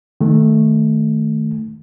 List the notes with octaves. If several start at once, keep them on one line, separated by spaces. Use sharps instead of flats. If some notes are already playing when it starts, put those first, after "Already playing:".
D#3 A3